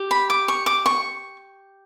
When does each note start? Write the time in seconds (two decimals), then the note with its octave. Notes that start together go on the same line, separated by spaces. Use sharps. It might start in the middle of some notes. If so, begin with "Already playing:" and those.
Already playing: G4
0.11 B5
0.30 D6
0.48 C#6
0.66 D6
0.86 C#6